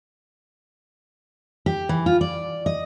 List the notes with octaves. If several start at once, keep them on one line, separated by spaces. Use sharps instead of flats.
G4
E3
F4
D5
D#5